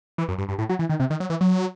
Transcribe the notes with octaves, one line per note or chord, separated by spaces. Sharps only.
E3
F#2
G2
G2
A2
F#3
E3
D#3
C3
D#3
F#3
E3
F#3